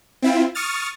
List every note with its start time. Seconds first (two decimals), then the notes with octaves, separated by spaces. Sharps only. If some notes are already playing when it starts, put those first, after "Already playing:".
0.22 C4 E4 F4
0.55 C#6 D#6 F6 A6